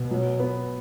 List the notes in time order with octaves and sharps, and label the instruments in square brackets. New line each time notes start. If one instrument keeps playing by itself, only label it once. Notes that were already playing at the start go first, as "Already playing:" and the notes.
Already playing: [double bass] B2
[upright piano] F#3
B3